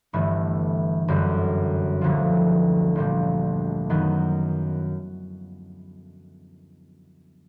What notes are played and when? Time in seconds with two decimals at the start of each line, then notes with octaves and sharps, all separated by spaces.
0.13 G1 G2 E3 A3
1.08 G1 F#2 D3 G3
2.01 E1 D2 D3 F3
2.96 A#1 A#2 G3
3.90 F#2 D#3 F#3 B3